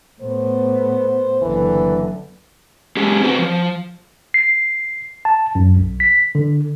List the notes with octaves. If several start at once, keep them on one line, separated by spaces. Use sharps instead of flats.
A2 B3 C5
F#1 D3 E3
G#3 C#4 G4 G#4
C4 F#4 B4
F3
C7
A5
F#2
B1
B6
D3